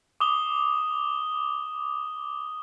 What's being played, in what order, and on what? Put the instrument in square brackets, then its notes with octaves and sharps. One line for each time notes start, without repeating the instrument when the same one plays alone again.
[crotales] D6 D#6 G7